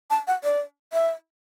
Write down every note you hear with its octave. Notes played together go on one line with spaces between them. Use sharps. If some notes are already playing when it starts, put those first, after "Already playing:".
A5
F#5
D5
E5